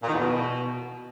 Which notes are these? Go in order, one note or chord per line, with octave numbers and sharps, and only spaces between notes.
A#2
D#3
E2
B2